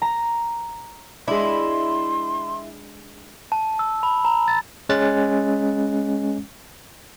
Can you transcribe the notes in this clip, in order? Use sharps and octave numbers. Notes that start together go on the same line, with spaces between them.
A#5
G#3 D4 E4 C6
A5
E6
B5
A#5
A6
G#3 C#4 F#6 A6